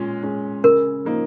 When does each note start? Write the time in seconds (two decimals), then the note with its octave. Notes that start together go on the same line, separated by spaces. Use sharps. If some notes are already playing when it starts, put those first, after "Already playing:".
Already playing: A#2 G#3 C#4
0.23 G#3 C#4
0.64 C#3 A#4
1.05 F3 A#3 D#4